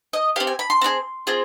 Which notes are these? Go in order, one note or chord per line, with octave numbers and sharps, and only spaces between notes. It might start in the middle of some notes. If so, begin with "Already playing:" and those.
D#5
C4 G4 F5
G#5
B5
C6
C4 D#4 G#4
C4 F4 G#4